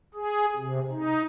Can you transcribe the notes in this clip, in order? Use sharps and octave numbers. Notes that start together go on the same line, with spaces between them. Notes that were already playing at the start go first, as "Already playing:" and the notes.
G#4
C3
D#4